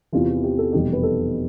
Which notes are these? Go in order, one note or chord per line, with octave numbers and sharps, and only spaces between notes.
E2 C3 E3 F4
F4
G4
A4
F1 E2 B2 G3 G4
B4
A4